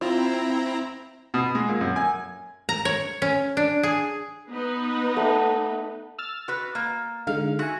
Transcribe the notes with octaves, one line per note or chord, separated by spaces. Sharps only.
C4 E4 F4 A#5
B2
G#3
A#2
F#2
G#5
A#5
C#5
C#4
D4
G#4
B3 D#4 B4
A3 F#5
E6 F6 A6
F#4 B4
A#3
D3 G#3 D#4 F5
F#4 E5 G#5